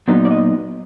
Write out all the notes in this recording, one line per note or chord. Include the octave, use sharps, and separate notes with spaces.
A#2 F#3 B3 D#4
D5
D#5